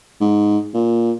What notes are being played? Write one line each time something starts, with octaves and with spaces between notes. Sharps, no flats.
G#2
A#2